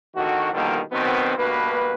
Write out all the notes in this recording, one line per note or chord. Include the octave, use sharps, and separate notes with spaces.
A1 D3 D#3 F#4
B2 D3 D#3 F3 G3 A#3
F#2 B2 D#3 B3 C4
D2 G2 B2 A#3 B4